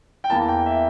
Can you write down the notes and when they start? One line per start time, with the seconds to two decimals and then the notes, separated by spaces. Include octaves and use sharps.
0.24 G5
0.30 E2 E3 A#3 A5
0.48 G5
0.66 E5